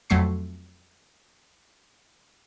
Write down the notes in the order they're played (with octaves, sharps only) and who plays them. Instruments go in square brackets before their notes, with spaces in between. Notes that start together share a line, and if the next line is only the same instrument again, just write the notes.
[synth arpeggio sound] F2 F#3 A3 C#6 C7